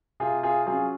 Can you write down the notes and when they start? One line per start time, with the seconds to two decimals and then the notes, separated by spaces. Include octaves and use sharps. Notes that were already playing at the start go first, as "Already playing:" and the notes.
0.20 C3 F4 G#4
0.43 F4 G#4
0.66 F#3 C#4 F4 G#4